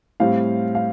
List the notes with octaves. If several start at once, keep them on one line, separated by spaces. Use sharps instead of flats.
A2 G3 C4 F5
F5